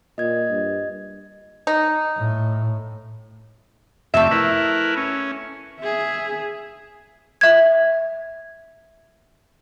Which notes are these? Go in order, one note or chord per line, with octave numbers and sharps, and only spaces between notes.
A#2 D#5 G#6
G2
D#4
A2
F2 C3 A3 E5
E4 A#4 B4
C#4
G#4 E5
E5 G#6